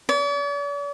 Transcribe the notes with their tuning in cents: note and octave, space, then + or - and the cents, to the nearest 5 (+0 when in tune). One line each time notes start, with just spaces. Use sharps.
D5 -45